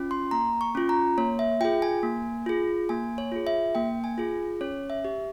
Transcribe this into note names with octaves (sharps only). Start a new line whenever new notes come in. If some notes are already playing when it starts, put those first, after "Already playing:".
Already playing: C#4 F4
C6
A#3 A#5
C#6
C#4 F4
A#5
A#3 C#5
E5
F4 G#4 G5
G#5
A#3
F4 G#4
A#3 G#5
C#5
F4 G#4
E5
A#3 G5
G#5
F4 G#4
C#4 C#5
E5
G4